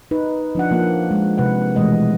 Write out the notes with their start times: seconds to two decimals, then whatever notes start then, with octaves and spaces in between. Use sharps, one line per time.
0.11 D#4 B4
0.55 F3 D4 F#5
0.71 F3 A#3
1.11 G#3
1.38 C3 B4 F#5
1.76 B2 E3 G#3 A3 D#5